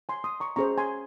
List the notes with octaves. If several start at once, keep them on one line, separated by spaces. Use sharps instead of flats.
G#5 C6
C6 D#6
A#5 C#6
C#4 G#4 C5 A#5 C#6
G#5 C6